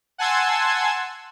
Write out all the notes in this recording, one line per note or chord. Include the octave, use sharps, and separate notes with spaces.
F#5 G#5 A5 C6 E6 G#6